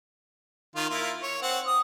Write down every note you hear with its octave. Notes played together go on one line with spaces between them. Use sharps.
D#3 F4
A#3 E4 F4
C#5
C4 F#5
D#6